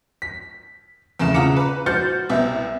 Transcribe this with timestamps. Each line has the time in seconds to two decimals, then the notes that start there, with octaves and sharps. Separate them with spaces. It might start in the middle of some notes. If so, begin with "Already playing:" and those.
0.22 B6
1.19 E2 C#3 A3 E7
1.34 C#3 F4 F#5 A#5 D6 C#7
1.57 B4
1.86 F#4 C5 F6 G6 A6 C#7
2.30 C2 B3 E5